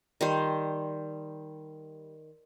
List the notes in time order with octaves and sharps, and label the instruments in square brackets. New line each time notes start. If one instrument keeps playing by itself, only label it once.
[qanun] D#3 G3 C5